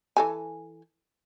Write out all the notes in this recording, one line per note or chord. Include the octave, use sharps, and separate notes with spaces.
E3 A4 G#5